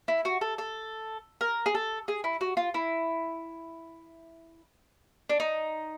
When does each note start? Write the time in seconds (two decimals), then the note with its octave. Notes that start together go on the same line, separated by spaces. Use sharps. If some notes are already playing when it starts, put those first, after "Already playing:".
0.08 E4
0.25 F#4
0.41 A4
0.58 A4
1.41 A#4
1.66 G#4
1.75 A4
2.08 G#4
2.24 E4
2.41 F#4
2.57 F4
2.74 E4
5.30 D4
5.40 D#4